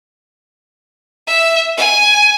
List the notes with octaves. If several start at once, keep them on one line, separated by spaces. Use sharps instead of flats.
E5
G#5